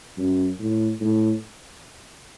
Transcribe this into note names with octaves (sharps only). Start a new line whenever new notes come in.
F#2
A2
A2